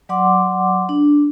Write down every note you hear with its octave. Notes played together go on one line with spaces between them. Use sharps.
F#3 D5 F#5 C6 D6
D4